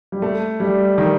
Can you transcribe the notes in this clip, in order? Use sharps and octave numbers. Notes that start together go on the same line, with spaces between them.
G3
A3
G3
D#3